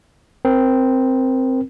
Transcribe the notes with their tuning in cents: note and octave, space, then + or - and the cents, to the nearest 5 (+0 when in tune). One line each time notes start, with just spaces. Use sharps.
C4 +0 A#4 +15